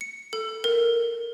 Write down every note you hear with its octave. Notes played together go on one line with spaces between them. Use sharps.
C#7
A4
A#4